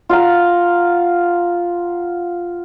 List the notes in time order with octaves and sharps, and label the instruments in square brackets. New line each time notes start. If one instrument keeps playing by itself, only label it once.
[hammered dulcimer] F4 F5 F#5 A#5